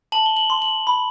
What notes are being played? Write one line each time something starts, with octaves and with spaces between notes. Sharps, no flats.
A5 F#7
G7
F#7
C6
F#7
B5